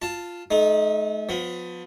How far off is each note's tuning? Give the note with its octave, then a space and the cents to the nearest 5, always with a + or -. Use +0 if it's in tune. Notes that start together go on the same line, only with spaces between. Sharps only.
F4 +0 A5 +10
A3 -35 D#4 +0
F3 +35 B3 +20